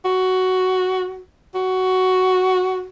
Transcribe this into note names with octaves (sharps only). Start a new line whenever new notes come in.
F#4
F#4